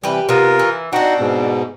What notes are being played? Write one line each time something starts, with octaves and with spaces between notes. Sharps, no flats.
C3 E3 G3 G4 B4
C3 B3 F4 A#4
E3
C4 D4 D#4 F#4 F#5
G#2 B2